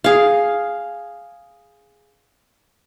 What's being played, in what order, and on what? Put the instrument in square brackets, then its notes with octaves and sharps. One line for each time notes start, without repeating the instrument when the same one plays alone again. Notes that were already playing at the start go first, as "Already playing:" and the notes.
[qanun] G#4 F5